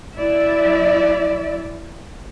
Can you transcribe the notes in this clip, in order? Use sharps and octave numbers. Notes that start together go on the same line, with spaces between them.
F#3 E4 D5 E5